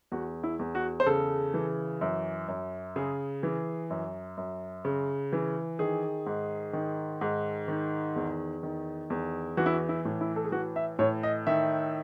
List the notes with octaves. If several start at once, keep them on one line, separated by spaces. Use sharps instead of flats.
E2 F#4
E4
E2
F#4
C5
C#3 A4
E3
F#2
F#2
C#3 G#4
E3
F#2
F#2
C#3
E3
D#3 G#4
G#2
D#3
G#2
D#3
E2
D#3
E2
E3 F#4
E4
F#4
E4
A2
E4
A4
G#4
E3 F#4
E5
A2 C#5
D#5
D#3 E5